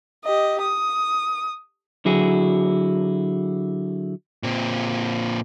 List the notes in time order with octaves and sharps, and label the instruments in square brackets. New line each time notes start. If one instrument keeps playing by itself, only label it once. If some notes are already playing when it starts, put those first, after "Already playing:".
[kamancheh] G4 D#5
D#6
[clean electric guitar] D3 F#3 E4 F#4 G#4
[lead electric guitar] A#2 C4